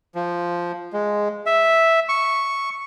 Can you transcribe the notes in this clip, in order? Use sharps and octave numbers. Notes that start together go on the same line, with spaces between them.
F3
G#3
E5
C#6